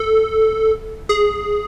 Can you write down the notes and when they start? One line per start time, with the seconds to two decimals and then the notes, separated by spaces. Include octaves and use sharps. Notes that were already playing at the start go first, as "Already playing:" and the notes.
Already playing: A4
1.09 G#4